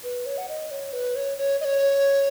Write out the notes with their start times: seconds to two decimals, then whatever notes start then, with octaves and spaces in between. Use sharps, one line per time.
0.04 B4
0.26 C#5
0.38 F#5
0.49 D#5
0.71 C#5
0.93 B4
1.16 C#5
1.38 C#5
1.61 D#5
1.65 C#5